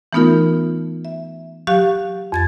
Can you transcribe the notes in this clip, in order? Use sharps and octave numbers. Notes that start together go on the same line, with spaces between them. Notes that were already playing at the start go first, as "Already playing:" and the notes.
E3 A3 B3 D#4 F4 A#4
E5
F#3 G4 F5 C#6 F#6
F2 G#6 A6